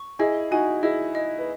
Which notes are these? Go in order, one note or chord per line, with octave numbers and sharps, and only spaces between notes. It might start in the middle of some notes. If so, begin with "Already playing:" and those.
Already playing: C#6
E4 G#4 D#5
D#4 F#4 G#5
E4 G#4 D#5
D#5
B4